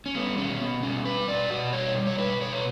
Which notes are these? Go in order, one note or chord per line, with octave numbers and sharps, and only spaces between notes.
C#4
G3 B3
B2 C#4
B2 B3
G3 C#4
G3 B4
B2 D5
B2 F#4
G3 C#5
G3
C#5
B2 B4
B2 C#5
B4